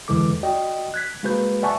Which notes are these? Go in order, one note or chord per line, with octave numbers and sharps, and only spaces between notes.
E2 D3 E3 G#3 A4 D6
F#4 D5 D#5 G5
F#6 G#6 B6
G#3 A#3 F#4 G#4 B4 G6
D5 E5 F#5 G#5 A5 C#6